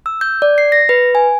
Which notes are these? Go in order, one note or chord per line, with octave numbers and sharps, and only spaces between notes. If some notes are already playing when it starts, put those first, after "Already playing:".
E6
G6
D5
C7
A#6
B4
G#5